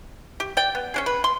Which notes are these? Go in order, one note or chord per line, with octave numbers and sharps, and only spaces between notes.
G4
D5 G5
B3
C#4 D4 G#4
B4
C6